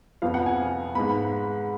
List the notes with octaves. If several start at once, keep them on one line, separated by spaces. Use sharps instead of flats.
F2 F3 B3 F5
F#5
G#5
G#2 G#3 B3 B5